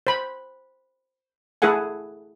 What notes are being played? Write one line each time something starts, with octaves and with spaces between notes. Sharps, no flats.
C5 B5
A3 E4 G#4 A4 F#5 G#5